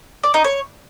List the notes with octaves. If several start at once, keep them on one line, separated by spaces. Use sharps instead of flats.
D5
D#4
C#5